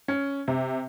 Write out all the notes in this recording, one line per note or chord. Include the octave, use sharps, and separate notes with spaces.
C#4
C3